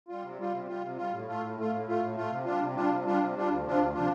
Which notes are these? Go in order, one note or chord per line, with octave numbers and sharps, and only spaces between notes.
G3 F4
C3
G3 F4
C3
G3 F4
C3
G3 F4
A2
A3 F4
A2
A3 F4
A2
A3 F4
A2
A3 F4
C3
G3 D4 F4
C3
G3 D4 F4
C3
G3 D4 F4
C3
G3 D4 F4
D2
C3 F3 D4 F4
D2
C3 F3 D4 F4